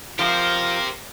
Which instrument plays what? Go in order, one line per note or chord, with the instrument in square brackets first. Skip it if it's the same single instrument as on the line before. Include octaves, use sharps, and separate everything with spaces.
[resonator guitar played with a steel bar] F3 [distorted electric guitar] G4 C5 [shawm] A#4